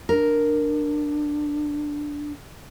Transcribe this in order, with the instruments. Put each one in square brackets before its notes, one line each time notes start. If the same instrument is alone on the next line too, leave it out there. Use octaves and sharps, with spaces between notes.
[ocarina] D4 [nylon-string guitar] A#4